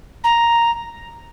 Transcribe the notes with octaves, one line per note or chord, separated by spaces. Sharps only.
A#5